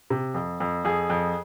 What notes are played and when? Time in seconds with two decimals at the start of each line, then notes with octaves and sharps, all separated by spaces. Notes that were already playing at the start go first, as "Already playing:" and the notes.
0.10 C3
0.34 F2
0.60 F2
0.85 F2 G#4
1.10 F2